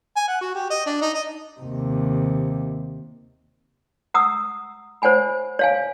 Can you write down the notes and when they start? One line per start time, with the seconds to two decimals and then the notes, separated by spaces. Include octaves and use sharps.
0.16 G#5
0.28 F#5
0.41 F#4
0.55 G4
0.70 D#5
0.86 D4
1.01 D#4
1.14 D#5
1.60 D#2 C3
4.14 F#5 A#5 D#6 E6
5.02 C5 C#5 F#5 G#5 B5
5.59 C#5 F5 G#5